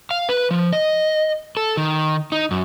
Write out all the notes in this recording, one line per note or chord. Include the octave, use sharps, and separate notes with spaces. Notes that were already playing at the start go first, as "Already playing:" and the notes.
F5
B4
F3
D#5
A4
D#3
D#4
F#2